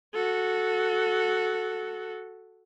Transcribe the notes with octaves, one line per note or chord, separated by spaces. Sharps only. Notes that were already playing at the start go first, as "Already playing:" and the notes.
F#4 A4